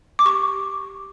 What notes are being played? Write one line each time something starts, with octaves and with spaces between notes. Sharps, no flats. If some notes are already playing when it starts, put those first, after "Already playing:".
D6
G4 C#6